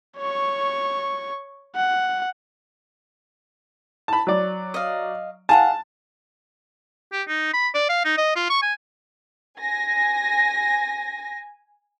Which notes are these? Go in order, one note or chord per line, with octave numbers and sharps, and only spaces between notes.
C#5 C#6
F#5
A5 B5
F#3 D5
D#5 F5
G#4 F5 F#5 A5
G4
D#4
B5
D5
F5
D#4
D#5
F4
C#6
G#5
G#5 A#6